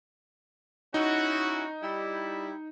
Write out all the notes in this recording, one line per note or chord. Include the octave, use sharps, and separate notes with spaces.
C#4 D#4 E4 F#4
G3 E4